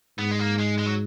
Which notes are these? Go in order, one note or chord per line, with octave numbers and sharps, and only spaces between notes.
G#2 B3
G#3
A#3
G#3
G#3
F#3